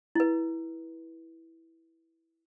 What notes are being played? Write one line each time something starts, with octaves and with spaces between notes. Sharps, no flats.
E4 B4